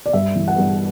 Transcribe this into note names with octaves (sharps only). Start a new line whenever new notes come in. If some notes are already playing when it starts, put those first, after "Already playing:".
D5
G2 E5
E3
F#5
G2